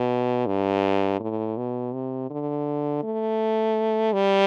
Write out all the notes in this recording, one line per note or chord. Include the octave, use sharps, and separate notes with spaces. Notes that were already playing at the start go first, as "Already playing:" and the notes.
Already playing: B2
G2
A2
B2
C3
D3
A3
G3